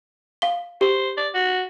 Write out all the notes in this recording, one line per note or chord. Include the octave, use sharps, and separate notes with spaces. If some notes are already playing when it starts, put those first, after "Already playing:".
F5 G7
G4 C5
D5
F#4